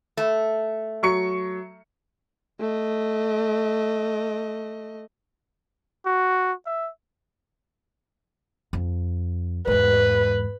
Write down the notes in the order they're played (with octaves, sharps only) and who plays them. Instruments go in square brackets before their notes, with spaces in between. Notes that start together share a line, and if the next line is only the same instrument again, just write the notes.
[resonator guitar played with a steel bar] A3
[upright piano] F#3 C#6 C#7
[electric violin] A3 D#5
[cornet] F#4
E5
[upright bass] F2
[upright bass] E2 G#2 [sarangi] B4